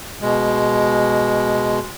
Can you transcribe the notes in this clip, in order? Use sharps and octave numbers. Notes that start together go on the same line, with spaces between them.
B2 G#3